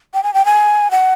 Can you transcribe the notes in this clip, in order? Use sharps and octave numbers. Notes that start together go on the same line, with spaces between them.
G5
G#5
G5
G#5
F#5